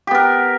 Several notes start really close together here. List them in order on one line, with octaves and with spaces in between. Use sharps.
G4 B3 A#4